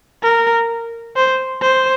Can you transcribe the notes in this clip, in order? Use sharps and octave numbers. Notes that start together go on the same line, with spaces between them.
A#4
C5
C5